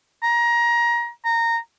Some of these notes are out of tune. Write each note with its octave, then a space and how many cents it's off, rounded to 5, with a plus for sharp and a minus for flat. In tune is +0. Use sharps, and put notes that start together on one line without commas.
A#5 +20
A#5 -15